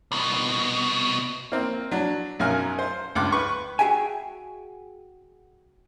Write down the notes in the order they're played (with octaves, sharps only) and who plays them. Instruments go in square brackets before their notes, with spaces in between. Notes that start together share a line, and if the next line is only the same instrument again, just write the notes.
[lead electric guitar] C2 B2
[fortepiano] A#3 C4
F#3 D4
B1 F#2 F#3 A#4 G#5 F6
C5
C#2 G2 C6 D6
B4 C#6
[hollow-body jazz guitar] F#4 G#4 E5 G5 G#5